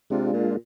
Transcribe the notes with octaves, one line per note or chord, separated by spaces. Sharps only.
C3 G#3 D4 F4
A#2